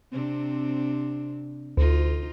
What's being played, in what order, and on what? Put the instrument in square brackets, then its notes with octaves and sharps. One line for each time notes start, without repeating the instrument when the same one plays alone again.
[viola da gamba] C3 C4 D4
[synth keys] D2 [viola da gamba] D#4 F4